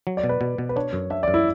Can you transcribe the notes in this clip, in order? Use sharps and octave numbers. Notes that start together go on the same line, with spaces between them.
F#3
D5
B2
B4
B2
B2
B4
D4 C#5
F#2
D4 E5
F#2 D5
E4